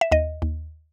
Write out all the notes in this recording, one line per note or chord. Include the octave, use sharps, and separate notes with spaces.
E5
D#2 D#5
D#2